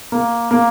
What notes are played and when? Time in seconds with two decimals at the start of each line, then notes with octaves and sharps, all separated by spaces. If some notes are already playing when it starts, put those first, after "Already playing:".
0.12 A#3
0.51 A#3